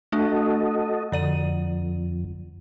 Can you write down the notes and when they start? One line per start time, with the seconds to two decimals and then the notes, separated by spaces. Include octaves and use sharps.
0.12 A3 D4 F#4 A4 D#5
1.12 F2 D3 D5 D#7